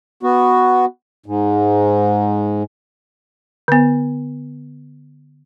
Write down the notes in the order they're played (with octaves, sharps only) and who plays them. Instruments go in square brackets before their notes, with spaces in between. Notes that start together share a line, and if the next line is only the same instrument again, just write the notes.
[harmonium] B3 F#4
G#2
[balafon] D3 B3